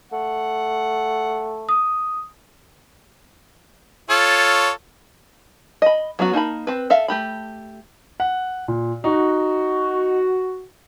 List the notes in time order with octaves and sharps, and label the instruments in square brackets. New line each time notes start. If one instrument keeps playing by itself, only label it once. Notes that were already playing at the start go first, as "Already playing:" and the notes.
[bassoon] A3 [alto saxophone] F#5
[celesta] D#6
[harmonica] F4 A4 C#5
[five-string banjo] D#5 B5
F#3 B3 C#4 F#4
A#3 D#4 A5 B5
C4 B4
A4 E5 F5
A3 G4 B5
[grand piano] F#5
A#2
[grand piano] D#4 [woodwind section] F#4